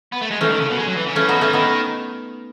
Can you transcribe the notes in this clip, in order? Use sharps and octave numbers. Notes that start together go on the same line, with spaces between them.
B3
A3
G#3
E3 A3 C#4
D#3
C#3
B2
G#3
F#3
E3
C#3
E3 A3 C#4
F#3 B3 D#4
E3 A3 C#4
D#3 B3 D#4